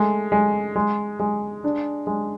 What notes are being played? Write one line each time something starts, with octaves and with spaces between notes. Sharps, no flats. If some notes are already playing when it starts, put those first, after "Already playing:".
Already playing: G#3 A3
G#3
G#3
G#3
D4
G#3